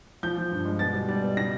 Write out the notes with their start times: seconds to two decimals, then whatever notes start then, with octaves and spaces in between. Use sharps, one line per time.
0.23 F3 G6
0.37 F3
0.51 G2
0.65 G#3
0.79 B2 A6
0.94 G3
1.08 G3
1.23 B2
1.37 C#3 A#6